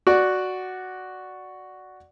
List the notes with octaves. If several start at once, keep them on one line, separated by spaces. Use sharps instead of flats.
F#4 D5 F#5